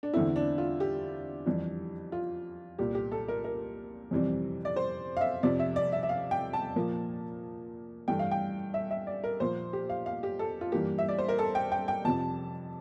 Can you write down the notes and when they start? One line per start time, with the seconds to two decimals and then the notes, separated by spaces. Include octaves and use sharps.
0.03 D4
0.14 E2 D3 A3 C4 E4
0.36 D4
0.58 F4
0.80 G4
1.46 F2 E3 G3
2.12 F4
2.78 C2 A#2 G3 G4
2.95 G4
3.12 A4
3.28 A#4
3.44 A#4
4.11 F2 C3 E3 G3 C4
4.65 D5
4.76 C5
5.17 F5
5.21 E5
5.43 F2 C3 F3 D5
5.59 E5
5.76 D5
5.92 E5
6.03 E5
6.09 F5
6.31 G5
6.53 A5
6.76 A#2 F3 A#3
8.08 G2 E3 A3 G5
8.19 F5
8.31 G5
8.74 E5
8.91 E5
9.07 D5
9.24 A#4
9.40 A#2 F3 A#3 C5
9.73 G4
9.90 F5
10.06 F5
10.23 G4
10.39 A4
10.61 F4
10.72 G2 E3 A#3 G4
10.98 E5
11.09 D5
11.18 C5
11.29 A#4
11.39 A4
11.55 G5
11.72 G5
11.88 G5
12.05 F2 C3 F3 A5